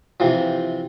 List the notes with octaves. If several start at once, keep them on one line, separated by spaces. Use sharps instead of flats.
C3 E3 F3